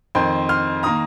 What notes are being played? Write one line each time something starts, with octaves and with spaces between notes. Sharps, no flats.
F2 D#3 C4 G5 C6
C6 F6
D#3 A#3 A#5 D#6